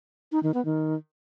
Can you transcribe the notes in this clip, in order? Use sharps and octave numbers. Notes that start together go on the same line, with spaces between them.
D#4
D#3
B3
D#3